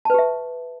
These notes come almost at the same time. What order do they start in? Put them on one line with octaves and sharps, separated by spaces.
A5 B4 G4 E5